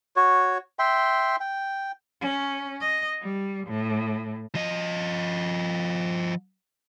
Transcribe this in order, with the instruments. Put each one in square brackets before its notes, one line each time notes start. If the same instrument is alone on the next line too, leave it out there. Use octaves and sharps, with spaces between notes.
[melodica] F#4 C#5
E5 G5 C6
G5
[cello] C#4
D#5
G3
A2
[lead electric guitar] F3 D#5